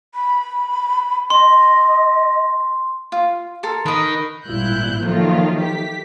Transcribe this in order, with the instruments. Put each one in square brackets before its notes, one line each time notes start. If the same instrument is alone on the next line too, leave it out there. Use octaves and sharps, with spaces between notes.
[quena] B5
[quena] D#5 [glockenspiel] C6
[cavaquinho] F4
A4 A#4 C6
[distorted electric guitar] D#3 [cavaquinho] D#4 B4
[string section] G#1 A#2 G3 E4 F#6 G6
D#3 F3 F#3 A3 A#3 F4
G4 B6